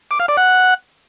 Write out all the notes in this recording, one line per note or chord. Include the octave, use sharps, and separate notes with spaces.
D6
F5
D5
F#5